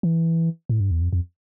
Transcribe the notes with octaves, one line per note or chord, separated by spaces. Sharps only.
E3
A2
G2
E2
F2
F2